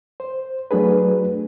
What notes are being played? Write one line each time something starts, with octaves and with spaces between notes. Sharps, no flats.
C5
F#3 A3 D4 G#4 B4